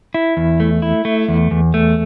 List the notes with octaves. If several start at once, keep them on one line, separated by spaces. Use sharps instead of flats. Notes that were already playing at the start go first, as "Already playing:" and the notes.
E4
E2
A3
E4
A3
E2
E2
A3